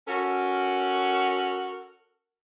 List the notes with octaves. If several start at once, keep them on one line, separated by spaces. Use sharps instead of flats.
C#4 F#4 A4 A#4